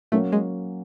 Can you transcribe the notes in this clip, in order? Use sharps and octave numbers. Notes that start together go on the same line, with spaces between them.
F#3 A3 A#3 C#4
G#3